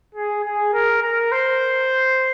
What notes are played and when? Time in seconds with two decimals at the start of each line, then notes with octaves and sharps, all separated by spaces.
0.15 G#4
0.44 G#4
0.73 A#4
1.02 A#4
1.32 C5